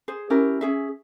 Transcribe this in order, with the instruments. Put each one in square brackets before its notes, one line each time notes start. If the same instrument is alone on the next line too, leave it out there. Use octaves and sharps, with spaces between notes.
[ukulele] G#4 C5
C#4 E4 G4 A#4
C#4 G#4 E5